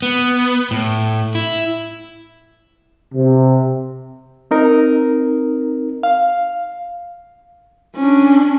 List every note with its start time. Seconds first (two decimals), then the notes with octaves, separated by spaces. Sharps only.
0.02 B3
0.71 A2
1.35 E4
3.13 C3
4.51 C4 D#4 A#4
6.03 F5
7.96 C#4 D4